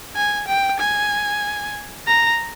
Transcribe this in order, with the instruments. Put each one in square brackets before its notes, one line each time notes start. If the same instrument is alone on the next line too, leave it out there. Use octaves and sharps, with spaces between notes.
[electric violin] G#5
G5
G#5
A#5